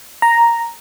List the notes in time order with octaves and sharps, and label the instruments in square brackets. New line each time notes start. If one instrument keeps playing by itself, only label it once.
[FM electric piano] A#5